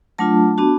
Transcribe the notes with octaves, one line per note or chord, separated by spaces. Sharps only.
F#3 A3 D4 F4 A5
B3 D4 F#4